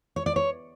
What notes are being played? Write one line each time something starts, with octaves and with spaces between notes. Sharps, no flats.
C#5
D5
C#5